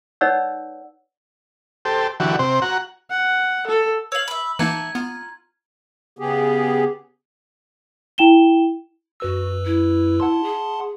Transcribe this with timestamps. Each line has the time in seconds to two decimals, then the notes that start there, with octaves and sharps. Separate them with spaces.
0.21 D#4 B4 C#5 D5 F#5 E6
1.85 G4 A4 C5
2.20 D3 E3 F#3 F#4 G4
2.39 C3 C4 C5
2.62 F#4 F#5 A#5
3.10 F#5
3.67 A4
4.12 C#5 F5 E6 F#7
4.28 E5 B5
4.59 E3 A#3 D#4 E5 F#5 A5 A#5 G#6
4.95 B3 F4
6.19 C#3 B3 G4 G#4
8.18 E4 G5 E7 G7
9.20 F#2 F#4 B4 E6
9.65 E4
10.20 F#5 A5 C6
10.43 G#4